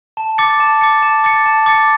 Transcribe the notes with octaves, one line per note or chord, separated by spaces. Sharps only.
A5
D6 A6 C#7
A5
D6 A6 C#7
A5
D6 A6 C#7
A5
D6 A6 C#7